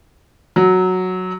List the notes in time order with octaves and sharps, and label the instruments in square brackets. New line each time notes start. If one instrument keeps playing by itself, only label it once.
[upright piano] F#3